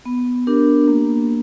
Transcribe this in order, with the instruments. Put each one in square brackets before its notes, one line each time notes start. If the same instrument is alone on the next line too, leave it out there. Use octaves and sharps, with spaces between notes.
[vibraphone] B3
D4 G4 A#4
A#3